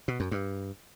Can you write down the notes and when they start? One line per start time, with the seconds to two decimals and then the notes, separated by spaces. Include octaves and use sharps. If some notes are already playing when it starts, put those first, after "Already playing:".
0.08 B2
0.20 F#2
0.31 G2